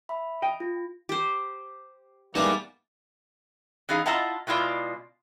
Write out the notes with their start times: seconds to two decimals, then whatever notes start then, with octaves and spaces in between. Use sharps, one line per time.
0.09 E5 B5
0.42 D#5 G5
0.60 F4
1.09 G4 C5
2.35 E3 G3 A#3 B3 D4 D#4 G#4 A5
3.89 E3 B3 D#4 G#4 F5
4.06 E4 F4 D#5 F#5 A5 A#5
4.47 B2 G#3 E4 F4 D5